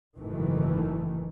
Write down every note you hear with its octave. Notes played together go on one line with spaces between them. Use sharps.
F#1 G#2 D#3 E3 A3